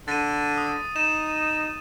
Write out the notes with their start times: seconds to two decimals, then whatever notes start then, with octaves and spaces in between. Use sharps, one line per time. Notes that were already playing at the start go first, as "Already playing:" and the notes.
0.08 D3 A6 D#7
0.58 D#6
0.96 D#4 D#7 E7